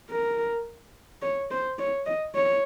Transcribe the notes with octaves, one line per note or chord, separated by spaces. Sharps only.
A#4
C#5
C5
C#5
D#5
C#5